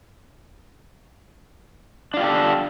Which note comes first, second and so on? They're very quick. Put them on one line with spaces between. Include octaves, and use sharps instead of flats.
D4 F4 G4 A4